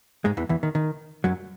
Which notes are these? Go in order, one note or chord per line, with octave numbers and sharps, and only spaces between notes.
G#2 G#3
E2 E3
E2 E3
D#3
D#3
F#2 F#3